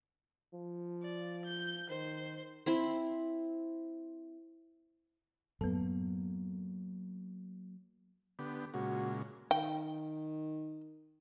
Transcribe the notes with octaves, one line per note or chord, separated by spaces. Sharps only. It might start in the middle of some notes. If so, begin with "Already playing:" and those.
F3
D5
G6
D#3 C5
C4 E4 B5
F#2 A2 F#3 A#3 B3 A4
D3 B3 G4
A#2 C#3 G#3 F#4
D#3 G5